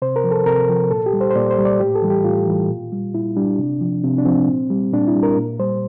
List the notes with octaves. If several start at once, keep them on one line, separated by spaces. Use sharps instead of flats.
C3 C5
A#4
F3
A4
C3 A#4
F3
A#2 A4
G4
G3
C5
C5
A#2 D5
C5
G3
D5
A2 G4
A4
E3 G3
G4
A2 F4
E3 G3
A#2
G3
A#2 E4
G3 D4
C3
F3
C3 C4
D4
F3 C4
A#2
G3
A#2 D4
E4
G3
A#4
A#2
G3 C5